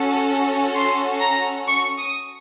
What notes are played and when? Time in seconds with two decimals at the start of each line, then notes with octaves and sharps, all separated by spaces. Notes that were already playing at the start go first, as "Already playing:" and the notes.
Already playing: C#4 F#4 A4
0.75 C6
1.21 A#5
1.67 C#6
1.98 D#6